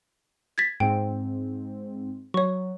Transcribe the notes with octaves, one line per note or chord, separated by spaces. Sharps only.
G#6 A6 B6
G#2 C4 G5
F#3 C#5 C#6